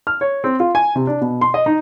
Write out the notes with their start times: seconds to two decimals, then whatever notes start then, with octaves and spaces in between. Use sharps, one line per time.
0.07 F6
0.21 C#5
0.44 C4
0.60 F4
0.75 G#5
0.95 C3
1.07 D4
1.21 B2
1.41 C6
1.54 D#5
1.66 D#4